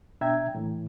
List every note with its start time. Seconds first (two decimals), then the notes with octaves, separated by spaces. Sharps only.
0.21 B2 D4 E5 G5 A#5 G#6
0.55 A2 E3